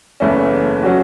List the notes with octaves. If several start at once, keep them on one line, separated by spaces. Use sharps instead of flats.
F#1 E2 E3 A3 C#4
F#3 C#4 F#4